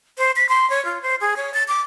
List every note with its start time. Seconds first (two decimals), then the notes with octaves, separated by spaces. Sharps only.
0.18 C5
0.36 B6
0.49 C6
0.70 C#5
0.85 F4
1.02 C5
1.21 G#4
1.37 C#5
1.54 A6
1.68 D6